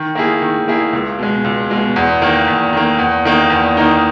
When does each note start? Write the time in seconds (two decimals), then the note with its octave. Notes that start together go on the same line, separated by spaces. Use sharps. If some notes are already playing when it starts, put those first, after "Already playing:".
Already playing: D#3
0.15 A#3 E4 G#4
0.42 D#3
0.68 A#3 E4 G#4
0.93 C#2
1.19 B2 G#3
1.44 C#2
1.70 B2 G#3
1.96 E2
2.22 D#3 A#3
2.48 E2
2.73 D#3 A#3
2.99 E2
3.25 D#3 A#3 D#4
3.50 E2
3.77 D#3 A#3 D#4